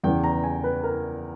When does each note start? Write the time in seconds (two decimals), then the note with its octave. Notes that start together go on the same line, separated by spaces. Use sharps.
0.03 E2 C#3 E3 G5
0.24 A#5
0.43 G#5
0.64 B4
0.83 A#4